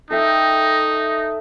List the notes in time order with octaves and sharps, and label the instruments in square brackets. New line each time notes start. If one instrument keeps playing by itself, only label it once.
[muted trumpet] D#4 [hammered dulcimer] A4 E5 G5